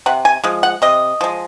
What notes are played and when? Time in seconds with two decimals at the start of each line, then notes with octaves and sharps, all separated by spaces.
0.06 C3 F#5
0.25 G#5
0.44 F3 G#3
0.63 F#5
0.82 C3 D#5
1.21 F3 G#3